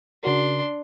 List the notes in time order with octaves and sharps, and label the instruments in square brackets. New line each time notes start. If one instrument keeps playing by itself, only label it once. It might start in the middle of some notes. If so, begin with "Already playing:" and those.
[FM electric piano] C#3 F#4 A#4 [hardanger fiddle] D4 C6